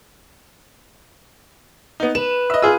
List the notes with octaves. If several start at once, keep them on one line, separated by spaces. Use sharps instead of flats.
B3 D#4
B4 E7
D#5 E5
F4 G#4 E6 D#7